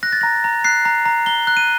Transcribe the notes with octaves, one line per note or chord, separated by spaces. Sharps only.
F#6 A#6
A6
A#5 A#6
A#5
F#6 C7
A#5
A#5
A#5 G7
F#6
D#7